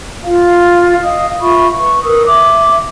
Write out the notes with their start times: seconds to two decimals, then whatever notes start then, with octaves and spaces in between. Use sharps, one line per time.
0.24 F4 F5
1.03 D#5 F5 D#6
1.40 F4 E5 B5 C#6
1.78 B4 C#6
2.02 A#4 B4 D#6 E6
2.25 E5 D6